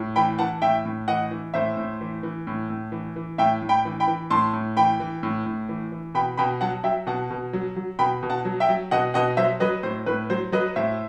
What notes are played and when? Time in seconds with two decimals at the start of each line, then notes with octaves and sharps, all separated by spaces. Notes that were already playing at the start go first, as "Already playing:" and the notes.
Already playing: A2
0.16 E3 G5 B5
0.38 E3 F#5 A5
0.62 A2 E5 G5
0.85 A2
1.08 E3 D#5 F#5
1.31 E3
1.54 A2 C5 E5
1.77 A2
2.01 E3
2.23 E3
2.47 A2
2.70 A2
2.92 E3
3.16 E3
3.38 A2 E5 G5
3.62 A2
3.69 G5 B5
3.85 E3
4.00 G5 B5
4.07 E3
4.30 A2 A5 C6
4.53 A2
4.77 E3 G5 B5
5.00 E3
5.23 A2
5.46 A2
5.69 E3
5.92 E3
6.14 B2 G5 B5
6.37 B2 G5 B5
6.61 F#3 F#5 A5
6.84 F#3 E5 G5
7.07 B2 F#5 A5
7.30 B2
7.53 F#3
7.76 F#3
7.99 B2 G5 B5
8.23 B2
8.30 F#5 A5
8.45 F#3
8.60 E5 G5
8.69 F#3
8.91 B2 D#5 F#5
9.14 B2 D#5 F#5
9.37 F#3 C5 E5
9.60 F#3 B4 D#5
9.83 A2 C5
10.06 A2 B4
10.30 F#3 C5
10.52 F#3 B4 D#5
10.76 A2 C5 E5